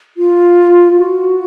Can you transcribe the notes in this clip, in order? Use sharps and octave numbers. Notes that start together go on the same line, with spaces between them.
F4
F#4